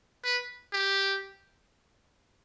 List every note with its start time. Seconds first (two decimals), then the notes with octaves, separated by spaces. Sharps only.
0.24 B4
0.73 G4